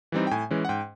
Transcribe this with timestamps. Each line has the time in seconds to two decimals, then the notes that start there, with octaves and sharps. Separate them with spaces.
0.12 E3 G3 C4 D#4
0.27 G5
0.31 A2 G#5
0.51 E3 G#3 C#4
0.65 F#5
0.69 G#2 G5